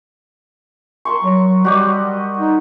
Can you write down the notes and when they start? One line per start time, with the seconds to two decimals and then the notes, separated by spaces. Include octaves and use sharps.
1.05 A#4 C6 C#6
1.23 F#3
1.65 G3 F#4 G4 D#5
2.39 D#4